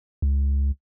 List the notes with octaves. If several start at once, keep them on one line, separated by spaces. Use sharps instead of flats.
C#2